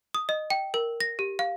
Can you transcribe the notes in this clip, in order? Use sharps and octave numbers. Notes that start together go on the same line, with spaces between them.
D#6
D#5
G5
A#4
A#6
G4
F5